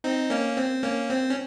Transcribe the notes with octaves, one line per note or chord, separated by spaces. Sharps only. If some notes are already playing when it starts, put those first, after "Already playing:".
C4 D#4
A#3 C#4
C4
A#3 C#4
C4
C#4